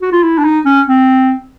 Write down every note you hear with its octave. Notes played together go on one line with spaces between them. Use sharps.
F#4
F4
E4
D4
D#4
C#4
C4